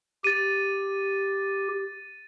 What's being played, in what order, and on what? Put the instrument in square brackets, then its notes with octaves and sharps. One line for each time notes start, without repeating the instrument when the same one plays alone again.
[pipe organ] G4 [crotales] A6 D#7